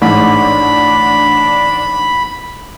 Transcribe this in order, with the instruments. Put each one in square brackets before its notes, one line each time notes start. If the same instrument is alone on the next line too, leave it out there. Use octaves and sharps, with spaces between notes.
[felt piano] A1 G#2 [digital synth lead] D4 [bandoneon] B5